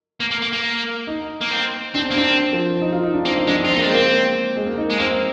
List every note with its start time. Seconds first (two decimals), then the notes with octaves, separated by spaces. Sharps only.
0.20 A#3
0.31 A#3
0.42 A#3
0.53 A#3
1.07 D#4
1.41 A#3
1.51 C4
1.94 C4 D4
2.06 C4
2.10 A#3
2.16 C4 D4
2.53 F3
2.82 D#4
2.92 F4
3.03 D#4
3.14 D4
3.25 A#3 C4
3.36 D#4
3.47 G#3 D4
3.58 C4
3.65 F4
3.69 C4
3.73 D#4
3.77 A#3
3.82 D4
3.85 G#3
3.90 A#3 C4
4.56 G#3
4.66 A#3
4.78 D#4
4.90 G#3
5.00 A#3 C4